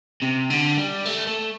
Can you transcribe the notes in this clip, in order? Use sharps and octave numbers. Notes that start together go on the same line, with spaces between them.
C3
D3
G3
A3
A3